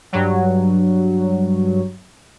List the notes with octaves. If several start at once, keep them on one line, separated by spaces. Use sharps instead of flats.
G2 F#3